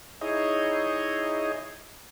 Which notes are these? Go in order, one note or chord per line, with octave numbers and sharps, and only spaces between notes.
D#4 E4 G#4 C#5 D#5